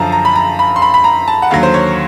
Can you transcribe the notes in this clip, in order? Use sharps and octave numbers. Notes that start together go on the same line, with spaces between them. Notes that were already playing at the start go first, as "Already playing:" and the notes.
Already playing: F#2 D3 F3 A5 A#5
A#5
B5
A#5
B5
C6
B5
B5
A#5
A5
F#5
D#2 D3 F#3 F5
C5
C#5